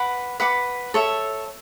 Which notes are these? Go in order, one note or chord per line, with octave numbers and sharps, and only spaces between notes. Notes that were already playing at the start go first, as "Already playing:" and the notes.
Already playing: B4 F#5 B5 D6
B4 F#5 B5 D6
A4 C#5 E5